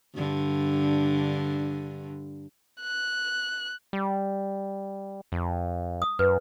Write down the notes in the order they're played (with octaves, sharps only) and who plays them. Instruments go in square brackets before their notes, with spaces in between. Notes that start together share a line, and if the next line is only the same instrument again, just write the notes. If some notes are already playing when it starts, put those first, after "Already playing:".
[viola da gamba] G2 D3
[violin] F#6
[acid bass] G3
F2
[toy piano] D#6
[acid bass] F#2 [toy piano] B4